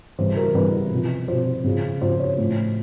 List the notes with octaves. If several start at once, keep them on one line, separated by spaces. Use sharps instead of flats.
C#3 E3 G3 C5
A#4
C#3 E3 G3 B4
C3 F3
C3 F3 C5
C#3 F3
C#3 F3 C5
C#5
A2 F3